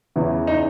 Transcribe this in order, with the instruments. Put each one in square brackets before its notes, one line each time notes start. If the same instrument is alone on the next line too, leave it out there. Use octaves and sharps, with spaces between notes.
[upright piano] E2 C#3 E3
D#4